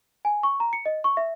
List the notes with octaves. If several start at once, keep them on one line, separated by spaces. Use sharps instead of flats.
G#5
C#6
A#5
C#7
D#5
C#6
E5